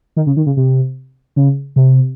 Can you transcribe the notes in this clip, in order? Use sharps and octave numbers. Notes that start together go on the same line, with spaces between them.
D#3
C#3
D#3
C#3
C3
C#3
C3